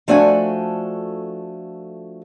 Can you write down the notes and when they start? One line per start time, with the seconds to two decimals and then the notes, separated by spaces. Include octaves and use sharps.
0.08 F3 A3 D4 F#4 A4 G#5